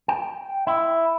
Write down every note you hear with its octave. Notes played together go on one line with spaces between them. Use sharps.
G5
E4